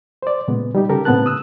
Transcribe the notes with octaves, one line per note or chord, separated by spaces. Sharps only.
C5 D5
A#2 C#3 G#3 B3
G3 D#4 G4
C#3 G4 A4 A#4
A2 C#3 B3 C4 A5 F#6
D#6 E6 F#6